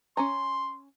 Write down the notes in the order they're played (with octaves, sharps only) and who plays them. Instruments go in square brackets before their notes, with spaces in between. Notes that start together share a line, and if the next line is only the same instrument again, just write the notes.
[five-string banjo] C#4 G#5 A#5 [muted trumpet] C6